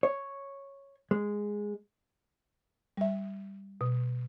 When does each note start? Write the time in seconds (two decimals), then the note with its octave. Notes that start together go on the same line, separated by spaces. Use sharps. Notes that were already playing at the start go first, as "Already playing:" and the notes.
0.03 C#5
1.11 G#3
2.97 G3 E5
3.81 B2